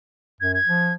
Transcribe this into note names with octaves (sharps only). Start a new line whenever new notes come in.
F#2 G#6
G#6
F3